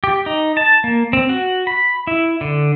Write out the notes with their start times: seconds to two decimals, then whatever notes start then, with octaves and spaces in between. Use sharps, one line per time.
0.04 G4
0.26 D#4
0.57 A5
0.84 A#3
1.13 C4
1.29 F#4
1.67 B5
2.07 E4
2.41 D3